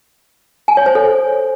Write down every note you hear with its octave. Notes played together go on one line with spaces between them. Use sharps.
G#5
C#5
C5
A4